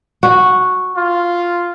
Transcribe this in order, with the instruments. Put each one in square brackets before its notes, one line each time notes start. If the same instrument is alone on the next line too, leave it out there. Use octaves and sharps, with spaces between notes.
[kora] F#4
[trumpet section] F4